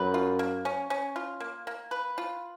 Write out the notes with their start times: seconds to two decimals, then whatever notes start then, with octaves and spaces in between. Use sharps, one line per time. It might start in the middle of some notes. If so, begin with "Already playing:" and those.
Already playing: F#2 B4
0.14 F4
0.39 A#3
0.65 C#4
0.90 C#4
1.16 F4
1.40 A#3
1.67 A#3
1.91 B4
2.18 F4